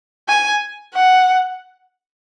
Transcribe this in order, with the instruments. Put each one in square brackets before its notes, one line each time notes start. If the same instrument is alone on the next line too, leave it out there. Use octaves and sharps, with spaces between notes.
[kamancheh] G#5
F#5